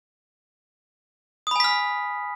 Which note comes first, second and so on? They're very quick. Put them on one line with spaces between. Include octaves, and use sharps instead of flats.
D#6 B5 G#5 B6 F6